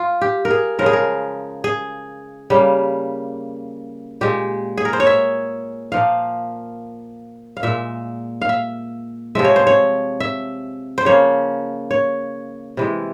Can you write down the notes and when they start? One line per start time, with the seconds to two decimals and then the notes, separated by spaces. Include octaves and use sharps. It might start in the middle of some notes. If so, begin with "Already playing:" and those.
Already playing: F4
0.21 G4
0.45 A#4
0.51 G#4
0.79 C#3 F3 G#3 A#4
0.86 G#4
0.93 A#4
1.64 G#4
2.50 C#3 G3 A#3
4.21 A#2 G#3 G4
4.77 G#4
4.85 A#4
4.93 C5
5.00 C#5
5.07 E5
5.92 A#2 F3 A#3 F5
7.57 F5
7.63 A#2 G#3 E5
8.42 F5
8.49 E5
9.35 C3 F3 G#3 E5
9.44 C#5
9.56 C5
9.67 C#5
10.20 E5
10.98 C5
11.05 C#3 F3 A#3 C#5
11.91 C#5
12.77 C3 E3 G#3